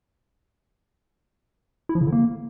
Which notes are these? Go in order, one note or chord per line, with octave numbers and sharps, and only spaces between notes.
E4
F3
C#3
D3
A#3